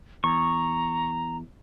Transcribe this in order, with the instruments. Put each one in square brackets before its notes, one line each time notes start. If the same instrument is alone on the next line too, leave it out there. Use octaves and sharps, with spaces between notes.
[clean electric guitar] E2 [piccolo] A#5 [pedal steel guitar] C#6